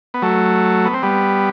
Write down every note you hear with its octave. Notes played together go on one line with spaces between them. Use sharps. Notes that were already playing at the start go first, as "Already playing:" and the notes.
B3
F#3 A3
B3
C4
G3 B3